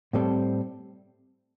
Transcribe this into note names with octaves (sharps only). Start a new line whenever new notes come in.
A2 G3 C4 A4